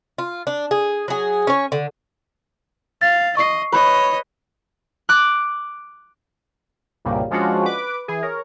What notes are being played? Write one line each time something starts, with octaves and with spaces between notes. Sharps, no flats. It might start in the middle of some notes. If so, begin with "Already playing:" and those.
F4
D4
G#4
F#3 G#4
C#4 C#5
D3
F5 A6
D#5 C#6 C7
B4 C#5 D#5
D6 F#6
C2 G2 A#2 C#3 G3 A#3
F3 G#3 C#4 D4 F4 F#4
B4 D6
E3 G#4
A#4 C#5